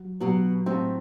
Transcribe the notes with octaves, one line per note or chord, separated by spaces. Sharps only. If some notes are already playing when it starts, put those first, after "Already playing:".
Already playing: F#3
B2 F#3 B3
A2 A3 C4